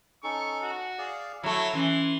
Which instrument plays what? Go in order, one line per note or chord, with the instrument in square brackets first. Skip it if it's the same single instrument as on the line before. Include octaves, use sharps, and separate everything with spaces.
[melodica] C#4 D#4 A4 [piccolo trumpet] C#6
[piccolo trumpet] F#4
[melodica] G#4 D5 F5
[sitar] F#3 A3 [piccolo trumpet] E4 [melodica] G#5
[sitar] E3 [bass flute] C#4 [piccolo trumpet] C6